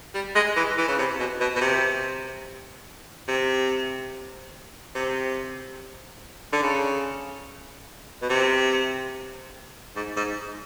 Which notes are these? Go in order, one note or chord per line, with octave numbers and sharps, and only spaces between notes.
G3
G#3
E3
E3
C#3
C3
B2
B2
B2
C3
C3
C3
D3
C#3
B2
C3
G#2
G#2